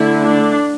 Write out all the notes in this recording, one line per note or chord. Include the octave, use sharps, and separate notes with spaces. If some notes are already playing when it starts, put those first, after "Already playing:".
Already playing: D3 A3 E4
D4